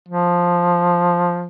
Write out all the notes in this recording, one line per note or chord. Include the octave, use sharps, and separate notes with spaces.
F3